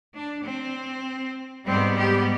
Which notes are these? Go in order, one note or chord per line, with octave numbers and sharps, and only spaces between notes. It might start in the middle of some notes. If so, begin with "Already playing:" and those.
D4
C4
G#2 G3 B3 C4
G4